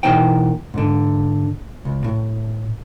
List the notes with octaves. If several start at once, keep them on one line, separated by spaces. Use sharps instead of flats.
B2 E3 A#3 D#4 C5 G5
G#2 D3
C#2
A2